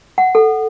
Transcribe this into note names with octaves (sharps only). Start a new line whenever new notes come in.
F#5
A4